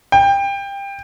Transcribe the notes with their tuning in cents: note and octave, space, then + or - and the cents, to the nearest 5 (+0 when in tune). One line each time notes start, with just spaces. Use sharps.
G5 +20